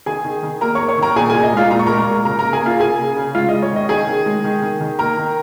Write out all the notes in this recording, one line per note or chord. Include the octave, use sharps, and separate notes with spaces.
D#3 G#4 G#5
D#3
D#3
A#3 A#4 A#5
A#3 C#5 C#6
C#5 C#6
D#3 A#4 A#5
A#2 G#4 G#5
A#2 G#4 G#5
D#5
G#3 F4 F5
A#2 A#5
C#6
A#4 A#5
G#3
A#4 A#5
A#2
C#3 A#4 A#5
A#3 A#4 A#5
G#4 G#5
A#3 F4 F5
C#3 G#4 G#5
C#3
C#3
G#3 F4 F5
D#5
G#3
C#5
D#3 D#5
D#3 G#4 G#5
D#3
G#3
D#3
D#3
D#3
A#3 A#4 A#5
D#3